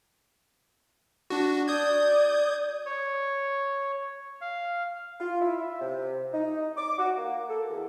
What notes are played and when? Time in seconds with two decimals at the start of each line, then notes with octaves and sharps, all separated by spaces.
1.30 D4 F#4
1.68 D5 D#6 G6 G#6
2.85 C#5
4.41 F5
5.20 F4
5.41 E4
5.58 E5
5.81 C3
6.33 D#4
6.77 D6
6.99 F#4
7.17 A#3
7.49 A4
7.69 E2